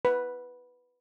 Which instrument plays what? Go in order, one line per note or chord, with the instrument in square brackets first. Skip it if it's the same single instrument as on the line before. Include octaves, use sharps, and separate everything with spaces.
[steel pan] B4